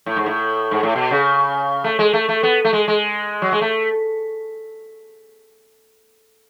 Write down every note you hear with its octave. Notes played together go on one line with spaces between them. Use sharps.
A2
G#2
A2
G#2
A2
B2
C#3
A3
G#3
A3
A3
B3
A3
G#3
G#3
F#3
G#3
A3